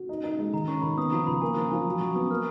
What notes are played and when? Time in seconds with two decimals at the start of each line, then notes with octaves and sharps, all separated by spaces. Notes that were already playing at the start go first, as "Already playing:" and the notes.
Already playing: F#4
0.09 D#4
0.24 D#4
0.39 G#3
0.53 D#3 A#5
0.68 C#4 C#6
0.82 D#3 B5
0.98 B3 D#6
1.12 F3 A#5
1.27 C#2 B5
1.41 A#3 G#5
1.56 F3 A#5
1.71 F3 G#5
1.85 F#3 A#5
2.00 F#3 C#6
2.16 B3 D#6
2.30 A#3 F6